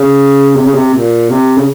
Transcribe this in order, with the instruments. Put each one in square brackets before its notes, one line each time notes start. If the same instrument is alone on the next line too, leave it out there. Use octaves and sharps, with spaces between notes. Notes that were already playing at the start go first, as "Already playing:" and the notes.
Already playing: [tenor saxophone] C#3
C3
C#3
C3
A#2
C3
C#3